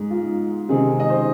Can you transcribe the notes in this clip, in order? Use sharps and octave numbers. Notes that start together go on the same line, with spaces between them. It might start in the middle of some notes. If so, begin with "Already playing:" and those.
Already playing: G#2 G#3 D#4
F4
C3 D#3 G#3 C4 D#4 G#4
D#5
C5